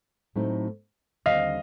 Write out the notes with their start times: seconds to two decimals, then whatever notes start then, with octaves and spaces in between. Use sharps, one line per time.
0.36 A2 F#3 A3 C4 D#4
1.26 D#2 D3 G3 C4 D#5 F5